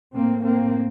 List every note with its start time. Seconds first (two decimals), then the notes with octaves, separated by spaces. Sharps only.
0.14 A2 A#3 C4
0.44 A#3 C4